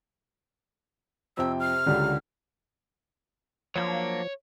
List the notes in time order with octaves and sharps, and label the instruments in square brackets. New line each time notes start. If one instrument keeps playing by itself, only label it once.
[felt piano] F2 G5 [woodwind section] C3 [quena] E6
[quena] F6
[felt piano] C#2 D3 [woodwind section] F#3 G3
[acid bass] F3 [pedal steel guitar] F#3 A#3 D4 [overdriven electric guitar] C#5